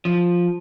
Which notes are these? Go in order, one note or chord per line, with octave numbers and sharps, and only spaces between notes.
F3